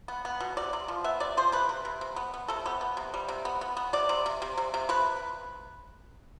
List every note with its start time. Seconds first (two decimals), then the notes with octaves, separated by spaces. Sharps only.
0.08 B3
0.25 B3
0.40 B2
0.57 C3 D5
0.73 C3
0.88 F3
1.04 B3 E5
1.20 C3 D5
1.37 F3 C5
1.52 C3 B4
1.69 C3
1.85 C3
2.01 C3
2.16 B3
2.34 B3
2.48 C3 A4
2.66 B3 G4
2.81 B3
2.97 C3
3.14 G3
3.28 C3
3.45 B3
3.61 B3
3.77 B3
3.93 C3 D5
4.09 C3
4.26 C3
4.42 C3
4.57 C3
4.74 C3
4.89 C3 B4